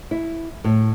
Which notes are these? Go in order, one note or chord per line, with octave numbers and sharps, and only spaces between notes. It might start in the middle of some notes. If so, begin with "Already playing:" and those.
E4
A2